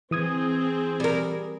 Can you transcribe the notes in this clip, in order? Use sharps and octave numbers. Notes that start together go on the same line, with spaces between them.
E3 C4 G#4 D#6 G#6
G3 A#4